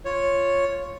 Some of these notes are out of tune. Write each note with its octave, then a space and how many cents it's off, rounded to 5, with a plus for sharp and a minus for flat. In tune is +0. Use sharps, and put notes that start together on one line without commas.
F4 +0 C#5 +0